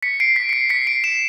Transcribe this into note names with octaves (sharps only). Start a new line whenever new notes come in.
B6 C#7
C7 D7
B6
C#7
C7
B6 C#7
C7 D7
D7 E7